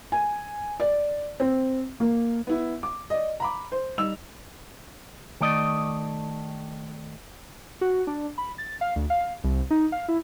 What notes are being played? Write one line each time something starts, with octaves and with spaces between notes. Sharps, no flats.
G#5
D5
C4
A#3
B3 E4
D6
D5 D#5
A#5 B5 D6
C5
G3 D#4 E6 F7
D#3 A3 D5 D#5
F#4
D4
B5
A6
F5
D2
F5
C2
D#4
F5
E4